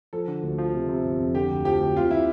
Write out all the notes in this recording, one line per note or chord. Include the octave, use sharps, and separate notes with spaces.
F3 A4
D3
D2
F3
C3
C3
G1
F2
D3 G4
D2
F3 G4
D2
C4 F4
E4